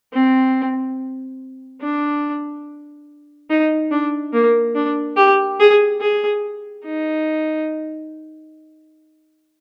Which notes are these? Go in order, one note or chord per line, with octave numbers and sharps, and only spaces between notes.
C4
D4
D#4
D4
A#3
D4
G4
G#4
G#4
D#4